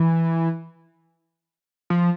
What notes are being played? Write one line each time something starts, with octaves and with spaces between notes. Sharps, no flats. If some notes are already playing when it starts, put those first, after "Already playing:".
Already playing: E3
F3